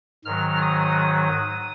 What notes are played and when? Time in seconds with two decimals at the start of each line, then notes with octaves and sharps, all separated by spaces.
0.25 G#2 D#3 F#3 F6
0.62 D#6